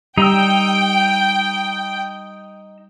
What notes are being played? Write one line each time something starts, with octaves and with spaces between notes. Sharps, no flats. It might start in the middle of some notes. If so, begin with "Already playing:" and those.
G3 D#4 G5 A#5 E6